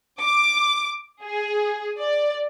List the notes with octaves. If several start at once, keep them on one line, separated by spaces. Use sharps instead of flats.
D6
G#4
D5